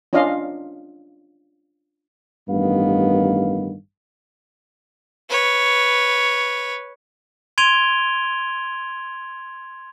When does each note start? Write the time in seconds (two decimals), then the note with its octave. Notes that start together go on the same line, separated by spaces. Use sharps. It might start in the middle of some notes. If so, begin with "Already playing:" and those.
0.13 C#4 D4 F4 D#5 F5
2.49 A1 G2 D#3 B3 F5
5.30 B4 C#5
7.58 C6 G#6 D7 D#7 F7 G7